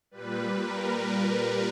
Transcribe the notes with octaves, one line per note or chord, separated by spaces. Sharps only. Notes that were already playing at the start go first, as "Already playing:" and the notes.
A#2 G3 B4
A#4
B4